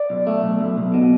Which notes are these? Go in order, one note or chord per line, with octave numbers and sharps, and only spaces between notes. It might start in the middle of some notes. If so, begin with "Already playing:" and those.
Already playing: D5
B1
A3
B1
B1
B1
B2